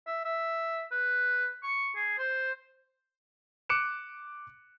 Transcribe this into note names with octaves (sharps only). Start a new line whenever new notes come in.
E5
E5
B4
C#6
G#4
C5
D6 F#6 C#7 D7 E7